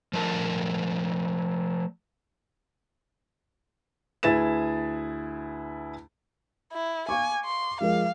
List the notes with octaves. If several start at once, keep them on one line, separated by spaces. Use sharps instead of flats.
F3 A3 A#4 A5
D2 E4 G#4 B4 A6 E7
E4
F5 G#5 C#6 D6
C6
F3 G#3 A#4 F5